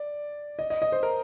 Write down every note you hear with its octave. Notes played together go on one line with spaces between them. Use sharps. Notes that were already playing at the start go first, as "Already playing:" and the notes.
Already playing: D5
D#5
D#5
D#5
C5
A#4